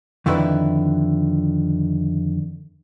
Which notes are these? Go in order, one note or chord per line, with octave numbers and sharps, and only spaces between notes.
F2 D3 D#3 E4 B4